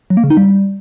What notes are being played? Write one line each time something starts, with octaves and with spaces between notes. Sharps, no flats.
F#3
A#3
C#3
D#4
G3